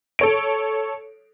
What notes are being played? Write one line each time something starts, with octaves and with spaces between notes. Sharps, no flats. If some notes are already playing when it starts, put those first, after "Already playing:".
A4 C#5 D7